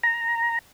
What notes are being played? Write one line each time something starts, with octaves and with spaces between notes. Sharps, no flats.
A#5